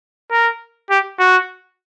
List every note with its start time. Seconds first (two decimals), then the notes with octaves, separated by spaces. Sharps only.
0.31 A#4
0.90 G4
1.19 F#4